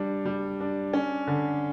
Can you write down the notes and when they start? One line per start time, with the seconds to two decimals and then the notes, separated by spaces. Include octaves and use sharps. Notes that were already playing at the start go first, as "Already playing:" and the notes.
Already playing: G3 D4
0.25 G3
0.60 D4
0.93 C#4
1.27 D3